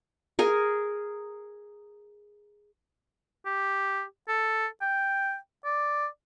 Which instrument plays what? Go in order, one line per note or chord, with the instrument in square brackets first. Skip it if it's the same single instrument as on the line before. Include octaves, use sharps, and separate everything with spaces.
[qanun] G#4 A#4
[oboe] G4
A4
G5
D5